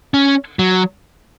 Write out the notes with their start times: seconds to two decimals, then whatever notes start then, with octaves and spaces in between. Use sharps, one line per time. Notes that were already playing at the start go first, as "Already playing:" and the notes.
0.14 C#4
0.59 F#3